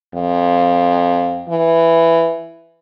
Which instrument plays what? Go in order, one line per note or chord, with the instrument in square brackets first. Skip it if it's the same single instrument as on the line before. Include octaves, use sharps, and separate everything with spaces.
[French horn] F2
E3